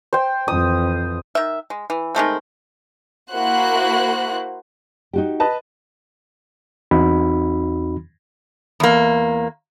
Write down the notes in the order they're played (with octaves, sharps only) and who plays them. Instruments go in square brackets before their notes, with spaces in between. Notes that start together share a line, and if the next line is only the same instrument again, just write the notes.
[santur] C5 G5
[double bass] F2 E3 [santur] D#6
[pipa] D#3 E5
G#3
E3
D#3 G#3 A3 C4
[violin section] A#3 E4 F#4 C5 F#6
[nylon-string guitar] D#4 F#4 G4
[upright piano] B4 D#5 A5
[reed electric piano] E2 C4 D#4 F#4 B5
[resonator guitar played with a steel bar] E2 A#3